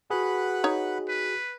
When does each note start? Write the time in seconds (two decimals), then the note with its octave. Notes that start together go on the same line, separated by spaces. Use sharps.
0.10 F#4 G#4 B4 F#5 B5
0.64 D#4 C#5 A#5
1.09 B4